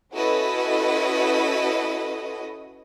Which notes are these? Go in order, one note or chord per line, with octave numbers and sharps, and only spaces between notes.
C#4 E4 F#4 A4 B4 D#5